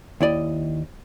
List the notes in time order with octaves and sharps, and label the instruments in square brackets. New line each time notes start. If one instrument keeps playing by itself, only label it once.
[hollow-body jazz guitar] D#2 E4 D5 D#5